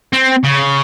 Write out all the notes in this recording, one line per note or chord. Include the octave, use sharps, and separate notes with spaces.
C4
C#3